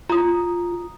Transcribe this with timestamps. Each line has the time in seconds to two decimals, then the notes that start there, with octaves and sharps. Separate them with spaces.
0.10 F4 A#5 D#6